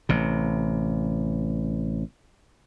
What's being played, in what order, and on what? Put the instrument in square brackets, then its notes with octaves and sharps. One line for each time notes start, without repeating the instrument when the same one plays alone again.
[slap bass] A1 C3